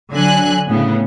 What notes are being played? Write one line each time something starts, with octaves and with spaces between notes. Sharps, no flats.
D3 F#3 G#5 F#6
A2 C#3 B3